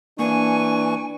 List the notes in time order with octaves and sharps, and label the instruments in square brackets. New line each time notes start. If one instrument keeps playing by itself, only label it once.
[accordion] E3 C#6 [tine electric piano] A#3 [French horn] D4 [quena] G#5